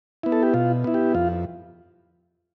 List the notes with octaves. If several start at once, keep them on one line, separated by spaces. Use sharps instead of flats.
B3 E4
A4
G4
B2 F4
B3 E4
G4
F2 F4